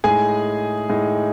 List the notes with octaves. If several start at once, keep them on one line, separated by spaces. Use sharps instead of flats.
A2 G#3 D#4 G#4 G#5
A2 G#3 D#4